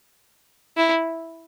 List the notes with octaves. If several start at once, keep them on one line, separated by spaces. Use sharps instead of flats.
E4